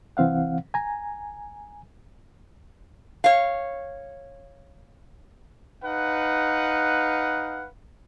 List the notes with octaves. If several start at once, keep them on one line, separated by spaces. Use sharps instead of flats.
C2 E3 C4 F5 F#5
G#5 A#5
C#5 F5
D#4 B4 F5 F#5